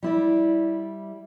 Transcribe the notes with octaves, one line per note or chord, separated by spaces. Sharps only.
G3 E4 D5